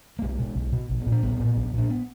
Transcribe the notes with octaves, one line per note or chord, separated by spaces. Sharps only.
A#3
B1 G#3
B2
B1
B2
A#1
B3
A#2
D4
A#1 B3
A#2
A#1
A#2 D4
B3